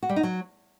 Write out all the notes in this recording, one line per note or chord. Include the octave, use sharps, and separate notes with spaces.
F#4
G3
D#4
F#3